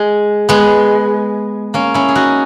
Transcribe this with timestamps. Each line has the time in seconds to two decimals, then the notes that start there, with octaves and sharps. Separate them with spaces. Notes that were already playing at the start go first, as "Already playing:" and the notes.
Already playing: G#3
0.49 G#3 B3
1.74 A#3 C#4
1.94 C#4 E4
2.09 G#4
2.15 D#4 F#4